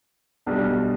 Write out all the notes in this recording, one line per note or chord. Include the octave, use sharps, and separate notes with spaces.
B1 B2 G3 D4 G4